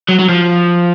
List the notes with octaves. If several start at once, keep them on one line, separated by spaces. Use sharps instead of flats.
F#3
F#3
F3